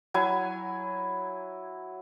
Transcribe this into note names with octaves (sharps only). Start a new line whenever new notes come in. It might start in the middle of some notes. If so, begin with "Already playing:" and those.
F#3 E4 G#5